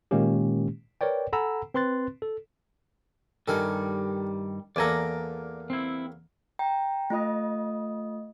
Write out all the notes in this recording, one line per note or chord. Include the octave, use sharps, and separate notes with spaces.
A#2 D#3 G#3 A#3 C#4 G4
A#4 B4 C#5 D5 G5
A4 F#5 G#5 A#5 B5 E6
C4 B4 C6 F#6 A6
A4
G2 D#3 G3 A4 A#4 G#5
E2 A#3 A4 D5 G#5 A#5
C4 E4
G5 A#5
A3 F4 D#5 D#6